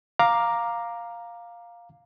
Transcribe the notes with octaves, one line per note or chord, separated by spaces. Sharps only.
F5 A#5 D6